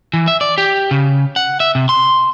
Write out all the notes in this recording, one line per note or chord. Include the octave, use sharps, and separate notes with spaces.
E3
E5
D5
G4
C#3
F#5
E5
C3
C6